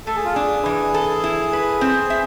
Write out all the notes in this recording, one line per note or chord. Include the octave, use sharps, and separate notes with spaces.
A3 A4
G#4
F4
D4 G#4
E3
A4
E4
B4
C4
E5